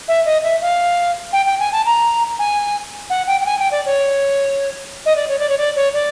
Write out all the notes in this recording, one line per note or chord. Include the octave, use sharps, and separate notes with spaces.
E5
D#5
E5
F5
G5
G5
G#5
A5
A#5
G#5
F#5
G5
G5
G#5
G5
D5
C#5
D#5
D5
C#5
D5
C#5
D5
C#5
D5